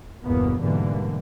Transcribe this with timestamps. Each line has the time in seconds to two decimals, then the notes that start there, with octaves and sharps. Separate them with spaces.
0.25 G1 E2 B2 A#3 B3
0.59 G#2 B2 D3 E3 G3 A#3